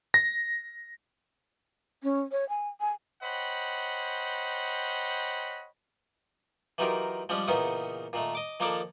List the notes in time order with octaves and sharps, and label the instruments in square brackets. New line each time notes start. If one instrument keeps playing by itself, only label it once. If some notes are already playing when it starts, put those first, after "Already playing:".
[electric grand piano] A#6
[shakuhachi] C#4
C#5
G#5
G#5
[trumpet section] C5 C#5 D#5 F#5 G5 B5
[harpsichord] E3 F#3 D#4 F4 G4 A#4
F3 G3 G#3 C#4 D4
E2 A#2 C#3 B3 C#4 D#4
A#2 D#3 A3
D#5 D6
D#3 F3 A#3 D4 A4 D6